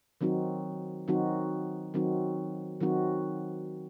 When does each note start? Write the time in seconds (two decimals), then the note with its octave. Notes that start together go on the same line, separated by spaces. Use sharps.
0.21 D#3 F#3 C4 D#4 F#4
1.08 D#3 F#3 C4 D#4 F#4
1.94 D#3 F#3 C4 D#4 F#4
2.81 D#3 F#3 C4 D#4 F#4